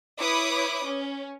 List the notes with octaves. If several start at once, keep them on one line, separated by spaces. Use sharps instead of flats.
E4 B4 C#5 B5 D6 D#6
C#4